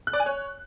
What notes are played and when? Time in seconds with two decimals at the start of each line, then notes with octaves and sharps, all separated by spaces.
0.07 F#6
0.13 D5
0.20 G#5
0.26 C#5